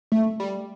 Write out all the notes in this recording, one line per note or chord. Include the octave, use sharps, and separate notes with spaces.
A3
G3